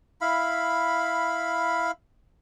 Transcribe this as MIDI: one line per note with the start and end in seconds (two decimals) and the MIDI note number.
0.21 1.91 64
0.21 1.91 77
0.21 1.91 83